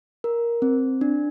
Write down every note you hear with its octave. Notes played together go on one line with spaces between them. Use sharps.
A#4
C4
D4